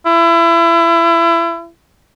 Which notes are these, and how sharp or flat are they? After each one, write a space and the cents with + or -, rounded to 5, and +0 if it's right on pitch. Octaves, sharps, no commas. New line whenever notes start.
E4 +30